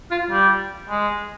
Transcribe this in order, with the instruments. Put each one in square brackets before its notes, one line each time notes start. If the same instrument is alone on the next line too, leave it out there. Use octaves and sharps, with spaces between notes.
[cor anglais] F4
G3
G#3